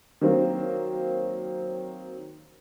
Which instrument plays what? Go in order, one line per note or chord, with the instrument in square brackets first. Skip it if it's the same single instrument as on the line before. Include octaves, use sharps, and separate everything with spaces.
[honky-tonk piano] D#3 F#3 A#3 C4